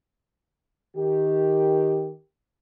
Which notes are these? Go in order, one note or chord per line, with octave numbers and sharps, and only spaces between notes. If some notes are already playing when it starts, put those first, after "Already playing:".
D#3 G4